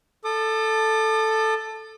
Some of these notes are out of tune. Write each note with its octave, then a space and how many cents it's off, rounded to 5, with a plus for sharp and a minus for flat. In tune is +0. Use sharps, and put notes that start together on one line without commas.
A4 +0 D6 +45